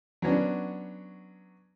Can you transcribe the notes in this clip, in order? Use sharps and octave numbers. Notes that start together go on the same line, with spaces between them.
F#3 B3 C#4 D4